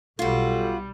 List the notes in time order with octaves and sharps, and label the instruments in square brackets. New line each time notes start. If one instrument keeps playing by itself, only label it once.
[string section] B1 [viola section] G3 [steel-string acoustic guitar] F4 F#4 [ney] A4